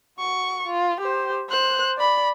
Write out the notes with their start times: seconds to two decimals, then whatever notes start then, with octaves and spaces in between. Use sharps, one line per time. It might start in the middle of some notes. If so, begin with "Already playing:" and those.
0.19 F#4 C#6
0.67 F4
1.00 G4 C5
1.49 C5 F#6
1.98 D5 B5